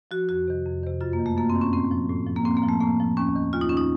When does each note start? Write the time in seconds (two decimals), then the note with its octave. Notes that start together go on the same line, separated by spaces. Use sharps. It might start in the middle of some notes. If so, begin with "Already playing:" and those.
0.11 F3 F#4
0.29 F2 F#4
0.48 C3 D#3
0.66 F2
0.83 C3 D#3
1.01 F#2 F4
1.13 A#3
1.19 D#3
1.26 A3
1.37 F#2 A#3
1.50 C4
1.55 D#3
1.61 C#4
1.73 A2 C4
1.91 F3
2.09 A2
2.27 F3
2.36 A#3
2.45 A2 C4
2.57 A#3
2.63 F3
2.69 A3
2.81 A2 A#3
3.00 F3
3.17 D#2 C#4
3.35 D#3
3.53 D#2 F4
3.61 D#4
3.69 D#3 C#4
3.77 D#4